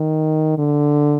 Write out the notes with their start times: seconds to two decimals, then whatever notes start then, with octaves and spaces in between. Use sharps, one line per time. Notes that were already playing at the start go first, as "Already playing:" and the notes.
Already playing: D#3
0.58 D3